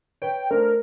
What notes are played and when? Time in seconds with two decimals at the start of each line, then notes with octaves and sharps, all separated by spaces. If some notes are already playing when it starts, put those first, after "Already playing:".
0.22 B4 C#5 G5
0.51 A3 D4 A#4 C5